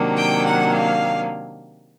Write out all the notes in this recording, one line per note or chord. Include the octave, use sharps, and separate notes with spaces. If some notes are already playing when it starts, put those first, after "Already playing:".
Already playing: C3 D#3 F#3 A#3 D4
G5
F#5
F5